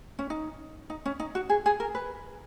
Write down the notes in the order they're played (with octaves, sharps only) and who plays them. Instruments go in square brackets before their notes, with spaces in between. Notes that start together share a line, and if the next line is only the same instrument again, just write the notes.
[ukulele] C#4
D#4
D#4
C#4
D#4
F#4
G#4
G#4
A#4
B4